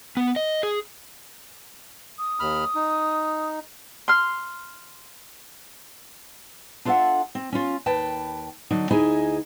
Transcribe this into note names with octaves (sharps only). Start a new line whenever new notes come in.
B3
D#5
G#4
D#6
D#2 B5 F6
D#4
C6 F6
D4 F4 A4 C#5 E5 F#5
C4
C#4 F4
D#2 B4 G5 A5
D3 F#3 D4 D#4
D2 D#4 E4 G#4 D#5 G#5